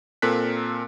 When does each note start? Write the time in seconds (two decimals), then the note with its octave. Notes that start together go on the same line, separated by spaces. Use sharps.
0.22 A#2 C4 A4 A#4 F#6 B6